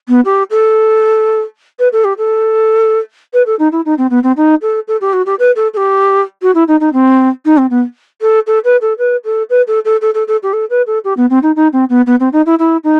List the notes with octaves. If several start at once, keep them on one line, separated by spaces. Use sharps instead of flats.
B3
G4
A4
B4
A4
G4
A4
B4
A4
D#4
E4
D#4
C4
B3
C4
D#4
A4
A4
G4
F#4
G4
B4
A4
A4
G4
F#4
E4
D#4
D#4
C4
D#4
C4
B3
A4
A4
B4
A4
B4
A4
B4
A4
A4
A4
A4
A4
G4
A4
B4
A4
G4
B3
C4
D#4
D#4
C4
B3
B3
C4
D#4
E4
E4
D#4